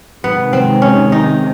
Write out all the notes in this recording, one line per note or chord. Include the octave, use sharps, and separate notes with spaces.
C3 D#3 G#3 B3
C4
C#4
D#4